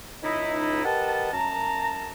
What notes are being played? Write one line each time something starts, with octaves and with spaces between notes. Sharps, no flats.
C#2 D#4 E4 D#5
G4 A#4 B4 D#5 F#5 A5
F#2 A5 A#5